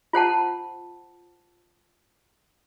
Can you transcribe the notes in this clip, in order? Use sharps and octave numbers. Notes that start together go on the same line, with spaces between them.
F4 C5 F#5 A5